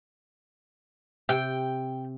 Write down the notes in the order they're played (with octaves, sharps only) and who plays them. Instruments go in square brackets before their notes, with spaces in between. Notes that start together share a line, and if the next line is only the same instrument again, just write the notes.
[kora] C3 [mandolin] G5